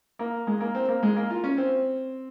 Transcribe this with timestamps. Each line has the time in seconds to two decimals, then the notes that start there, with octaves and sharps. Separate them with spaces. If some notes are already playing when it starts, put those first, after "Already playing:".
0.19 A#3
0.47 G#3
0.61 A#3
0.75 C4
0.89 A#3
1.03 G#3
1.16 A#3
1.30 F4
1.44 C#4
1.58 C4